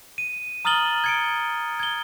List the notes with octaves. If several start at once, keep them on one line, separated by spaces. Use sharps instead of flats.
D#7
A#5 D#6 F6 A6 F#7 G7
G#6 C#7 D7
G#6 G7